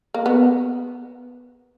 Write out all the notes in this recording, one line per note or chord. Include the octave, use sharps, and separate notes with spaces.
A#3
B3